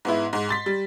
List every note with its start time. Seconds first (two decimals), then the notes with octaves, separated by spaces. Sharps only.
0.05 G#2 B3 E4
0.33 G#2
0.49 C6 A6 B6
0.66 G3